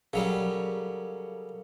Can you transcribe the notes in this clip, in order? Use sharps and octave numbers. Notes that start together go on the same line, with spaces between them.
C#3 F#3 G3 A4 A#4 F5